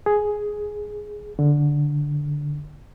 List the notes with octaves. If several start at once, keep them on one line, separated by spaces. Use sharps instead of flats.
G#4
D3